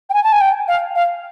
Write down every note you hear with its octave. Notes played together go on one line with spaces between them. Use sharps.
G5
G#5
A5
G#5
G5
F5
F5